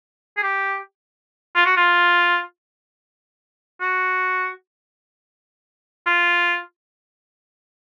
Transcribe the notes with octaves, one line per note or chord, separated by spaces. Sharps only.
G#4
G4
F4
F#4
F4
F#4
F4